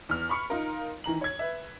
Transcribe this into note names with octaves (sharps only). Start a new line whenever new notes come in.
E2 F6
B5 C#6 C#7
D#4 F4 A#4
D#3 E3 A#5 F#7
C#5 G#6
B4 E5